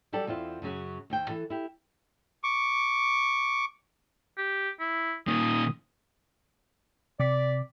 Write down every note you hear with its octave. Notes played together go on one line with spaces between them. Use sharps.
F#3 G3 G4 A4 D5
E2 C4 E4 F4
F#2 C#3 F#3 F#4
D#2 C5 G5
E3 A4
E4 G4
C#6 D6
G4
E4
A#2 D#3 D#6
C3 D5 D6 B6